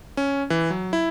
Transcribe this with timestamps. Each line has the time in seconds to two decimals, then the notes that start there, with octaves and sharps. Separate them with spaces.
0.17 C#4
0.50 E3
0.70 F#3
0.93 E4